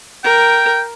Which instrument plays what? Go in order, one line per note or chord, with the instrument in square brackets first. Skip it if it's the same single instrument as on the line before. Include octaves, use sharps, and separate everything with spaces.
[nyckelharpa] A#4 [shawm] G5